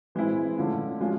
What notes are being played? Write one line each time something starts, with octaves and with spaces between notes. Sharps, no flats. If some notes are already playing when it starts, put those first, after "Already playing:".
E3 G#3 C4 E4
D3 F3 A3 C#4 F4
F3 G#3 C#4 F4